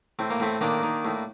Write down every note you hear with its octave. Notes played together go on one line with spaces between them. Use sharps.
A2 C4
A#3
A2 A3 C4
D#3 A#3 D4
D#3
A2